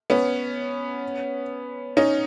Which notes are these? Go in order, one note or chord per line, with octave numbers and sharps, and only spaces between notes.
B3 C#4
C#4 D#4